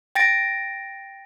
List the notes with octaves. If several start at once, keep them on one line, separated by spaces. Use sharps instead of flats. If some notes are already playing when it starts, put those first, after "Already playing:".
G5 A6 A#6 D7